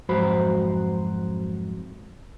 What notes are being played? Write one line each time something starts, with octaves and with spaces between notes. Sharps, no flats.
F2 G#2 F#3 F#4 C5 B5